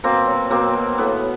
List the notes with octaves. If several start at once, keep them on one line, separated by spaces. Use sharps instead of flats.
B2 A#3 C4
F#3
B2 A#3 C4
B2
A2 B3